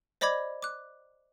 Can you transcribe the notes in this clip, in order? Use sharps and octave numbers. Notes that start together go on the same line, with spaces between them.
C5 D5 D#5 B5 D6 G#6
D6 F#6